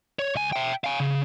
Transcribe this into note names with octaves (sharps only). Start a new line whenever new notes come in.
C#5
C#2 G#5
E5 G5
F5 G#5
C#3